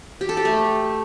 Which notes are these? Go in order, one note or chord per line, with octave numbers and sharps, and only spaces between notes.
G4
A4
G4
A3